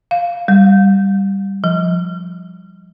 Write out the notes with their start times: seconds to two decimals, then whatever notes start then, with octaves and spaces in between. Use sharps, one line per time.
0.11 F5
0.48 G3
1.64 F3